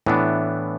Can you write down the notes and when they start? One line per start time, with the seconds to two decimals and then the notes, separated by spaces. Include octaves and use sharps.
0.06 A2 E3 B3 D4